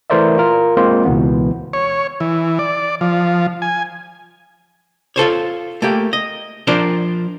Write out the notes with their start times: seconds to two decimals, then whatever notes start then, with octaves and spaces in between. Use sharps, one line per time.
0.10 E3 A3 A#4 C5 D5 E5
0.38 F4 A#4
0.77 G#3 A#3 C4 F4 C5
1.05 C#2 B2 E3 B3
1.73 C#5
2.20 E3
2.59 D5
3.01 F3
3.62 G#5
5.16 F4 A4 C5 C#5
5.82 A3 A#3 G4
6.13 D#5
6.67 F3 D4 F4 A#4 C5